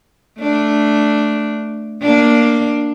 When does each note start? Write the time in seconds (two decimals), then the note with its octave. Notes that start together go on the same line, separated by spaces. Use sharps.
0.39 A3 D4
2.02 A#3 D4